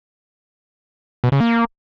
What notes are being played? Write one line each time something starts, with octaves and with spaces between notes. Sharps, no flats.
B2
C#3
A#3